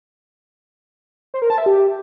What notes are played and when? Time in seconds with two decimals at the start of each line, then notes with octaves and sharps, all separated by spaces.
1.34 C5
1.42 A#4
1.50 A5
1.58 E5
1.66 G4